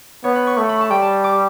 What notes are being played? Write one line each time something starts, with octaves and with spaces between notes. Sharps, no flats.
B3 C#5
B5
C#6
A3 C#6
B5
A5
G3 G5
A5
D6